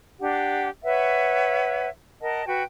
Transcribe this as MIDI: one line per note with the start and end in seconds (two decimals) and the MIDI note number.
0.20 0.68 62
0.20 0.68 67
0.20 0.68 78
0.84 1.88 71
0.84 1.88 73
0.84 1.88 76
0.84 1.88 78
2.21 2.44 70
2.21 2.44 75
2.21 2.44 78
2.21 2.44 81
2.46 2.63 66
2.46 2.63 71
2.46 2.63 79